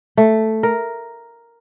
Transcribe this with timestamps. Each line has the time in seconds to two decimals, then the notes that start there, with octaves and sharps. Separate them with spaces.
0.17 A3
0.63 A#4